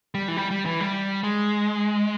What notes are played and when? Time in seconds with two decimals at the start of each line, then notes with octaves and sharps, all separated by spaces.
0.15 G3
0.28 E3
0.37 G3
0.51 G3
0.66 E3
0.80 G3
1.23 G#3